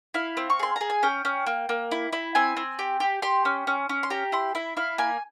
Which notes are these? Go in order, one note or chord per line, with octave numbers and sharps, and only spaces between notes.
E4 F5
C4
C#6
G#4 C6
G#4 A#5
G#5
C#4 G5
C#4
A#3
A#3
E4
E4
C4 G#5
C4
G4
G4
G4 C6
C#4
C#4
C#4
C6
G4 A#5
E4 C6
E4 E5
E4 F5
A#3 G#5